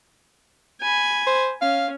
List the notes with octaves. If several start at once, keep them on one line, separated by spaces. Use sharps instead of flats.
G#5 B5
C5
C#4 F5